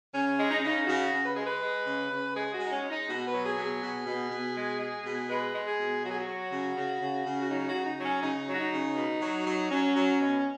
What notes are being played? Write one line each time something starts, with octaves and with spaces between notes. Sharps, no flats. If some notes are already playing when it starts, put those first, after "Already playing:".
C#3 C#4
G#3
D#4
C#4
C#3 D#4
C#3 F#4
C#3
B4
G#3 G#4
B4
G#3
C#3
C#3
G#3 G#4
F#4
G#3
D#4
C#4
G#3
D#4
B2 F#4
B4
F#3
G#4
B2
G#4
B2
B2
B2
G#3
G#3
B2
G#3 B4
G#3
G#4
B2
F#3 F#4
G#4
F#4
F#3
C#3
C#3
C#3
C#3
F#4
F#3 D#4
F#4
C#3
D#4
F#3
C#4
C#3 D#4
F#3
F#4
D#4
C#3
B2
F#3
F#3
F#3 C#4
F#3
B2